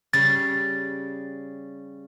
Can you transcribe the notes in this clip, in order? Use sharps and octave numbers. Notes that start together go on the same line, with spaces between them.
C#3 G3 A6